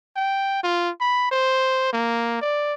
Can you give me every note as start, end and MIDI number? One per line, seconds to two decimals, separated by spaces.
0.16 0.59 79
0.63 0.90 65
1.00 1.29 83
1.31 1.88 72
1.93 2.41 58
2.42 2.74 74